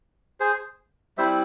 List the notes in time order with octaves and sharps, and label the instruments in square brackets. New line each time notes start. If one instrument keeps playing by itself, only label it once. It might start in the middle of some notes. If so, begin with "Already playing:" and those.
[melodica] G#4 C5
G3 C4 E4 C5 E5